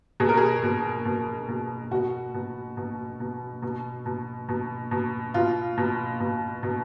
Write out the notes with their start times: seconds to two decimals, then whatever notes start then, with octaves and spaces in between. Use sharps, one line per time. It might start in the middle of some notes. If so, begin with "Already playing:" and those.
0.20 B2 G#4
0.29 A#4
0.37 G#4
0.63 B2
1.05 B2
1.48 B2
1.91 B2 F#4
2.34 B2
2.77 B2
3.20 B2
3.62 B2
4.06 B2
4.49 B2
4.91 B2
5.34 B2 F4
5.78 B2
6.20 B2
6.63 B2